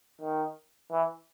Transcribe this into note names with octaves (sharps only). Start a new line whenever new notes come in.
D#3
E3